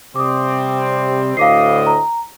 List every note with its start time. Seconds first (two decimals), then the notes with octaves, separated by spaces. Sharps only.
0.16 C3 G3 C4 D6 D#6
1.37 D2 A2 D#5 F5 D6 C7
1.86 A#5